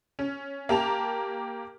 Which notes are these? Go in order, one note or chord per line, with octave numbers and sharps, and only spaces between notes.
C#4
A#3 G4 A5 F7